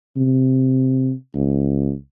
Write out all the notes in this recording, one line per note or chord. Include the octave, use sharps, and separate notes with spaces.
C3
C#2